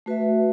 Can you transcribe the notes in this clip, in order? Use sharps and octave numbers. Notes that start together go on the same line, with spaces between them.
A3 F#4 B4 E5